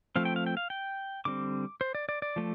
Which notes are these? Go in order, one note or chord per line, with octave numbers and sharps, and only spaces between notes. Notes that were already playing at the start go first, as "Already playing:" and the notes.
F3 A3 C4 F5
G5
F5
G5
F5
G5
D3 G3 C4 D6
C5
D5
D5
D5
F3 A3